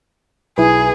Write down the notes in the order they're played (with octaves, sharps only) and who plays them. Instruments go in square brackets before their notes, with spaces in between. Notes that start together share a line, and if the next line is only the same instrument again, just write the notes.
[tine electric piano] B1 [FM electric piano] E4 B4 [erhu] G#4